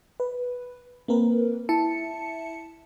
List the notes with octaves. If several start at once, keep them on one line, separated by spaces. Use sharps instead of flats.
B4
A#3 C4 A#4 B4
E4 E5 A5 C#7